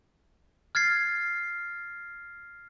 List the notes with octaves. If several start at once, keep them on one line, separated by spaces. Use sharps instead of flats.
F6 G#6 A6 C7